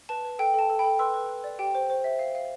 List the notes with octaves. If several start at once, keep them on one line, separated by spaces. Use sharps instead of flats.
B4 A5
B4
A4 G5
A4 A5
A4
G5 B5
A4
B4 C6 E6
B4
B4
D5
G4 G5
C5
C5
E5
F5
F5